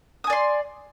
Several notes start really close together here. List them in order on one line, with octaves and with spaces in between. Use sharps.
D#6 G#5 D5 C6